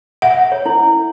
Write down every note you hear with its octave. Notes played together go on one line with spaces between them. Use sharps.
E5 F#5
C#5
E4